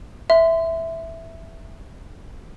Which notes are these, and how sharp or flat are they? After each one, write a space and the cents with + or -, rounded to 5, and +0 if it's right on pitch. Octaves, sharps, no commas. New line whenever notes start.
E5 +0 C6 -30